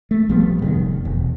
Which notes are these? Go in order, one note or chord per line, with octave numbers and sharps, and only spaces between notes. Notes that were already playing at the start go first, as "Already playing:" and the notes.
A3
A#1 F3 G3 B3
F1 B2 D#3
E1